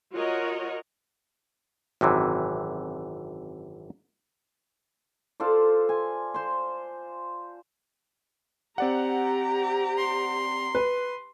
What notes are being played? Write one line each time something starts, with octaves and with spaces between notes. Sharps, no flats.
F4 F#4 A#4 C#5 D#5 F#5
G#1 F#2 C3 E3
F4 A4 C5 D5
G#5
C5 C6
C4 G4 D5 F#5 A#5
C6
B4